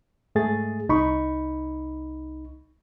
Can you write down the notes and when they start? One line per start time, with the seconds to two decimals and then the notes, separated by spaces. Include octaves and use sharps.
0.35 G#2 A3 G#4 A6
0.89 C2 D#4 B5 C#6